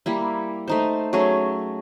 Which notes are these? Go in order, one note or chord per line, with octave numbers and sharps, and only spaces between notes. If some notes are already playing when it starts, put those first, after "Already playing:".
G3 A#3 E4
A3 D#4 C5
F#3 A3 C#4 G#4